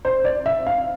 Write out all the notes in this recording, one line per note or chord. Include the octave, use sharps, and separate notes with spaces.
C5
D5
E5
F5